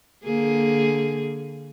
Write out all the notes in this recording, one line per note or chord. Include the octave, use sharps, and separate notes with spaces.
D3 A#3 G#4